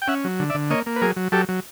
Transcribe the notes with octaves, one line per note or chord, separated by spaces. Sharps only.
G5
C#4 E5 F#5
F#3
D3
D5 E5
D3
A#3 C#5 D#5
A#3
B4
F#3 G#4 A#4
F#3
F#3 G4 A4
F#3